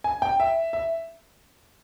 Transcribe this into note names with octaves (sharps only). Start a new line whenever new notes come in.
G#5
G5
E5
E5